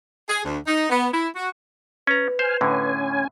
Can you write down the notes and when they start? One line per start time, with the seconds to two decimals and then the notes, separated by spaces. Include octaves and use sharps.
0.28 G#4
0.44 D2
0.65 D#4
0.88 B3
1.12 E4
1.35 F#4
2.07 C#4 B4 A#5
2.39 C5 G#5 F6
2.61 A2 D3 C#4 G#5